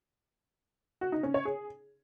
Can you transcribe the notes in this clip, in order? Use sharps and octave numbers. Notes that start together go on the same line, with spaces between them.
F#4
D#4
C#4
C#5
G#4